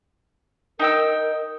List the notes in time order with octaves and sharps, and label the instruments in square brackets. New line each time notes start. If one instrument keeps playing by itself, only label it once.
[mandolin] D#4 G5 E6 [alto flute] A#4